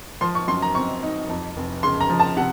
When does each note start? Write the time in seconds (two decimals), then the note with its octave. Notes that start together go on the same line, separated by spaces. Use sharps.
0.21 F3 C6
0.35 C#6
0.48 F#2 C6
0.62 A#5
0.75 C4 C#6
1.03 D#4
1.29 F2
1.57 F1
1.83 C#3 C6
2.01 A#5
2.10 F3
2.20 A5
2.37 C3 F#5